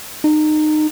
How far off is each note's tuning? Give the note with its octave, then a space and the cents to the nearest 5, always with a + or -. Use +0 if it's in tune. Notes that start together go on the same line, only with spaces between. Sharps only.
D#4 -25